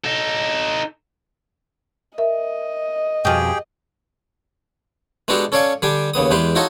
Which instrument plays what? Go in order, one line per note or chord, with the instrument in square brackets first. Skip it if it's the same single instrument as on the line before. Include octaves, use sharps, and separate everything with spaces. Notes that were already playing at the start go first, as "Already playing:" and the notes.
[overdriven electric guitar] D#4 A4
[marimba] A#4 E5 [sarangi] D#5
[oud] F2 B2 [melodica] G4 G#4 G5
[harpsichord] G#3 B3 D4 F#4 G4 A4
C#4 A4 C#5 D5 F5 G#5
D3 G3 D4 G4 G#5
D#2 C#3 B3 D#6
E2 G#3 G4 B4 C6
D#4 F4 F#4 A4 C#5 D#5